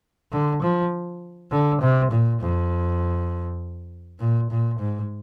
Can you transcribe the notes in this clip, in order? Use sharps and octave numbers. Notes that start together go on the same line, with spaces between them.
D3
F3
D3
C3
A#2
F2
A#2
A#2
G#2